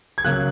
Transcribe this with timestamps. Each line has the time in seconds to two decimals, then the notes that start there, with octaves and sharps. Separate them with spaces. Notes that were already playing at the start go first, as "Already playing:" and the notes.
0.18 G#6
0.24 C#3 F#3 A#3 C#4 F#6